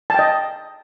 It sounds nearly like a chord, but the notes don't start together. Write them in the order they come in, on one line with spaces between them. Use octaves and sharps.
A5 G5 D#5